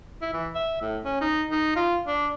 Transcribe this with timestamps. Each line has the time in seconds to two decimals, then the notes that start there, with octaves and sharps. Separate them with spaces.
0.22 E4
0.34 E3
0.55 E5
0.82 A2
1.05 C#4
1.21 D#4
1.51 D#4
1.76 F4
2.08 D4